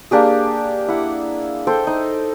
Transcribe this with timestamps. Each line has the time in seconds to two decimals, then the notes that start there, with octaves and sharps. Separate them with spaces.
0.11 A#3 D4 G4 G#4
0.88 E4 F#5
1.67 A4 C5 G5
1.87 D#4